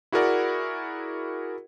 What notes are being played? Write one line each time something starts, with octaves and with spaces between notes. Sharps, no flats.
E4 F#4 G#4 A#4 D5 F#5